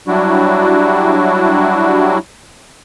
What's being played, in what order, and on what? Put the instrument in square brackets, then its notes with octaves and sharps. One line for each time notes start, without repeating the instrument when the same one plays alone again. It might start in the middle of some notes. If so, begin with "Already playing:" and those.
[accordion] F#3 G3 D4 E4 F#4